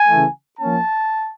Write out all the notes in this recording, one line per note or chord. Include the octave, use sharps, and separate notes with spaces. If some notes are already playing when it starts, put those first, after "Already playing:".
Already playing: G#5
C#3 E3 A3
F3 A#3 C#4 A5